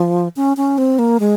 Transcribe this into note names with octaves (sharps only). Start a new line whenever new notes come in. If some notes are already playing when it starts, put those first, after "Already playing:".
Already playing: F3
C#4
C#4
C4
A#3
G#3